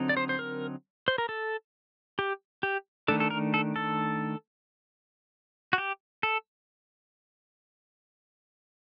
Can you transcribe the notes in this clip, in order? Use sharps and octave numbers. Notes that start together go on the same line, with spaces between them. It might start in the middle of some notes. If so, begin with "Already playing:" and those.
Already playing: D3 F#3 C4 D#4
D5
C5
C5
A#4
C5
A#4
A4
G4
G4
D#3 A3 D4 A4
A4
A#4
A4
A4
F#4
G4
A4